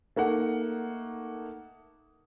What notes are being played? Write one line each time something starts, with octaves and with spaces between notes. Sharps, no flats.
A3 A#3 D#4 F#5